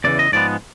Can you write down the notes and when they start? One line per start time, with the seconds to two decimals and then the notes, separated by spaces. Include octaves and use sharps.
0.04 E2 C#3 E3 D5
0.19 D#5
0.32 G#2 F3 G#3 B3 D5